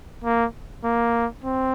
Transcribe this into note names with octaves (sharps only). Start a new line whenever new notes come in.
A#3
A#3
C4